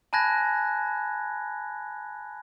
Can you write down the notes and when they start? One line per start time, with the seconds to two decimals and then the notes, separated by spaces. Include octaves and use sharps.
0.13 G#5 A5 B5 F#6 G#6 A#6